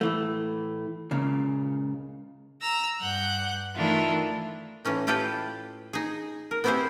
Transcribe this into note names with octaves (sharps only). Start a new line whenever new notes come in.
A2 E3 A3
C#2 A#2 C#3
A#5 E6 A#6
G2 F#5 F#6 G6
D#3 E3 A3 D4 E4 F4
A2 E3 C#4 D#4
E4 F4 G4 A4 B4 G5
D#4 G#4
A#4
B3 C4 E4 G4 G#4 C5